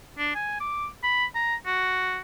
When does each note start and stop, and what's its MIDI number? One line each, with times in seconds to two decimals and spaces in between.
0.18 0.32 62
0.35 0.59 80
0.60 0.87 86
1.03 1.25 83
1.35 1.55 82
1.66 2.20 66